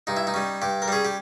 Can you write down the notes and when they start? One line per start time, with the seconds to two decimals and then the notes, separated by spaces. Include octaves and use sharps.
0.07 G2 D#4
0.17 E4
0.27 D#4
0.34 G3 C#4
0.62 G2 G4
0.82 A#4
0.88 G3 C#4 G#4
1.05 G4